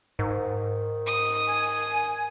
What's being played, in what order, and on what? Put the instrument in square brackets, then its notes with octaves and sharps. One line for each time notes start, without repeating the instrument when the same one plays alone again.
[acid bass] G#2 [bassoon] D#3
[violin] D#6
[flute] G#5